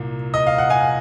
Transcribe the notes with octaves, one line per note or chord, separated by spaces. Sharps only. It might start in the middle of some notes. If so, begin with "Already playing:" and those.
Already playing: C2 A#2
D#5
F5
F#5
F5 G#5